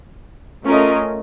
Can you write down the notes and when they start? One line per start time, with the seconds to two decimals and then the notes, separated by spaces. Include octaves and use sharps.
0.65 A3 C#4 F4 A#4 D#5